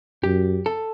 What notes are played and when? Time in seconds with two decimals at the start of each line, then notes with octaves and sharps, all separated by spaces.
0.23 F#2 G4
0.66 A4